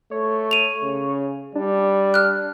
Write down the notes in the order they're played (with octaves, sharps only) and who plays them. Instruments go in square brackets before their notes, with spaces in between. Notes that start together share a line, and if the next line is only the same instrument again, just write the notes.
[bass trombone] A3 [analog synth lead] C#5
[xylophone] D#7 F7
[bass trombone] C#3
[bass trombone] G3 [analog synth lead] D4
[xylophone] F6 F#6